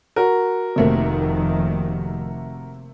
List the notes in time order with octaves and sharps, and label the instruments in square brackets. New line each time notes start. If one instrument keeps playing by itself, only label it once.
[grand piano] F#4 A#4
[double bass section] F1 D#3 [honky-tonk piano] C3 A3 A#3